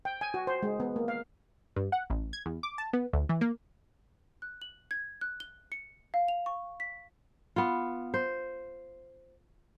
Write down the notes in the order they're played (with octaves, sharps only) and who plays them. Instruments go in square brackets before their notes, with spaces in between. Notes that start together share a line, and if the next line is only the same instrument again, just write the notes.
[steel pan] G5
G#5
F#4
C5
G#3
B3
A#3
F5
[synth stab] G2
F#5
A1
G#6
E2
D6
A5
B3
D2
E3
A#3
[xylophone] F#6
F#7
G#6
F#6
G7
C#7
F5
F7
C#6
B6
[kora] B3 F4
C5